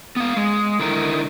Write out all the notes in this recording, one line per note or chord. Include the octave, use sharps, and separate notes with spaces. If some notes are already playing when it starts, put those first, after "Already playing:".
B3 F5
G#3
D3 D#4 E4 A#4